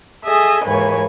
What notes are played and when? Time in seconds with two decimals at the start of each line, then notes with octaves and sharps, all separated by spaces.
0.23 G#4 A4 D#5 E5 G#5 D#6
0.65 D#2 G#2 E3 B4 C#5 G#5